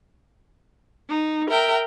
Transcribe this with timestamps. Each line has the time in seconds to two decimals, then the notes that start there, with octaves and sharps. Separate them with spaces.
1.09 D#4
1.50 A#4 E5 G5